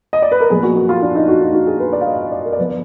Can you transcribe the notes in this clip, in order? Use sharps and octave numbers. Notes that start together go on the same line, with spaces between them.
D#5
D5
B4
A#4
A#2 F3 B3 G#4
F#4
F#4
F4
D4
D#4
F#4
D#4
F#4
G#4
B4
D5
F5
D#5
D5
A#4
D5
D3 F3 B3 B4